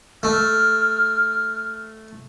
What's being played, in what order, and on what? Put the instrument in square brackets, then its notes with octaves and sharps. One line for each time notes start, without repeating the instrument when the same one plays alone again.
[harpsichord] A3 [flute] F6